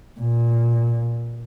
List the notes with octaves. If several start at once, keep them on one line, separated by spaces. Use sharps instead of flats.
A#2